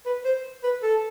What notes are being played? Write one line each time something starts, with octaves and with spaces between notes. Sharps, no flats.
B4
C5
B4
A4